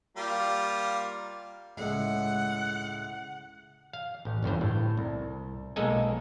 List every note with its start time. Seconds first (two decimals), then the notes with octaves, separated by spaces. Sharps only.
0.17 G3 A#3 F4
1.77 C#2 A2 G#3 F#5
3.93 F5
4.25 A1
4.43 G1 E2 G2 C5
4.61 A2
4.98 C2
5.76 B1 G#3 A#3 A4 D#5 G#5